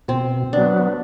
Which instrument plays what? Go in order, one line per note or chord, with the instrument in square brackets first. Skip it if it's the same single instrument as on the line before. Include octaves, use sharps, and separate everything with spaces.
[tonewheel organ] B2 [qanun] C4
[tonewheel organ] F#3 B3 [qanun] D4